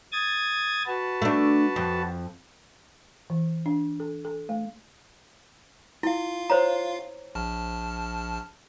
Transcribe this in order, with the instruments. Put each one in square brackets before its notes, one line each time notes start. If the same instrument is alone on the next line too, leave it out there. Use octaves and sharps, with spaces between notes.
[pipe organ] D#6 G#6 A6
F#4 B4 A5
[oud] A3 D4
F2
[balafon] E3
D4
A4
A4
A3
[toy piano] E4 [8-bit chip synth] F4 F5
[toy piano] C5 C#5 A#5
[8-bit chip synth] A#1 A5 F6